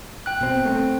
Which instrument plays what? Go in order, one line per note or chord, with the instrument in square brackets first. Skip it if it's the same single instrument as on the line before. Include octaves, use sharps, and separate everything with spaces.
[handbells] G5 F#6
[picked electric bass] B2 C4
A3 A#3 C4